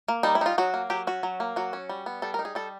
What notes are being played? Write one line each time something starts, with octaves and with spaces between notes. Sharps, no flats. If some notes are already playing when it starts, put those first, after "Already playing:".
A#3
G3 D#4
E4
D#4 F4
F#3 F#4
A#3
F#3 G4
C#4 F#4
F#3
A#3
F#3 F#4
C#4
G3
B3
G3 A4
A#4
D#4
G#4
G3 A4